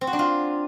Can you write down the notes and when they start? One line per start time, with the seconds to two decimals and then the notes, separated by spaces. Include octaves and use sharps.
0.01 C4
0.07 F#4
0.13 D4
0.19 F4